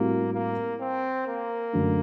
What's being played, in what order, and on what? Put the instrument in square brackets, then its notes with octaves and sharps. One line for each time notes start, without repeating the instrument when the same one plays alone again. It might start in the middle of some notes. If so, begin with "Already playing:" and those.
Already playing: [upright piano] A2 G3 C4 F#4 [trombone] A#3
[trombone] A#3
C4
A#3
[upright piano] F#2 D3 F#3 A3 D4